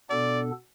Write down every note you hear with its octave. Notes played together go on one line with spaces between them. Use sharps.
B2 B3 D4 A4 D5